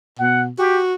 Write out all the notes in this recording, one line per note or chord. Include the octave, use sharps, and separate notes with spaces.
B2 F#5
F#4 G4